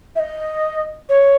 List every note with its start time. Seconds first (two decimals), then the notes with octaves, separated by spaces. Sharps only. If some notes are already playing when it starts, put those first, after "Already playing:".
0.16 E5
0.19 D#5
1.09 C#5